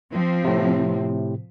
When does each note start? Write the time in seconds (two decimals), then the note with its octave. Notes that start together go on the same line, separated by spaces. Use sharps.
0.11 F3 C4
0.44 A2 C3